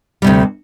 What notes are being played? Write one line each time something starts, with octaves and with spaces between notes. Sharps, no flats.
D2 C3 G3